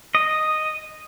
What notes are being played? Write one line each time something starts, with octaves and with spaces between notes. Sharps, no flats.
D#5